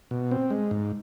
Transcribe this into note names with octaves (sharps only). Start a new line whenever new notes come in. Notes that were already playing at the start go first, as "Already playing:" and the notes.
B2
C4
G#3
G#2